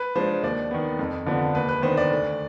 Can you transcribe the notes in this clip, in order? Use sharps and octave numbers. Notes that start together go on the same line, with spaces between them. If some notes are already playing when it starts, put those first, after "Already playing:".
Already playing: B4
F3 G#3 D4 C5
D#2 D5
D#3 B3
F2
D3 F3 B3 D4
D#2 B4
B4
D#3 B3 D4 C5
D5
D2